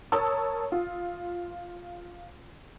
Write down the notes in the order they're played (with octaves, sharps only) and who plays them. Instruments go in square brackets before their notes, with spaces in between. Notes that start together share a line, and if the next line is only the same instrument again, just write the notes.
[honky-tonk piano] A#4 C#5 A5 D#6 E6
F4